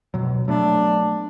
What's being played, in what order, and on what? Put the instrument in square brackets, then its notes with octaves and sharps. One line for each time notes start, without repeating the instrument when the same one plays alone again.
[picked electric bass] B2 F#3
[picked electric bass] F#3 A3 B3 [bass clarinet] D4